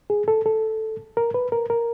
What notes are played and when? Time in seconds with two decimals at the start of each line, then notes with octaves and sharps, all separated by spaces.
0.10 G#4
0.28 A4
0.46 A4
1.17 A#4
1.34 B4
1.52 A#4
1.70 A#4